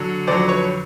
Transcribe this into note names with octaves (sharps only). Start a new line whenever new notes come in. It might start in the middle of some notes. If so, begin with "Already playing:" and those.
Already playing: D3 F#3
F2 D3 F#3 C5 D5
B4 C#5